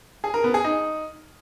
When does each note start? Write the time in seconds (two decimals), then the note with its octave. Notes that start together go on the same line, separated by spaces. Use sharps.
0.24 G#4
0.34 A#4
0.44 B3
0.54 G#4
0.64 D#4